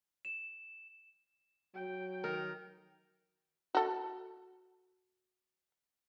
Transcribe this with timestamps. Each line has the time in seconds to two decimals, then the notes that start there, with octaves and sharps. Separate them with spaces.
0.25 E7
1.75 F#3 G5
2.24 D#3 A#4
3.75 F#4 A4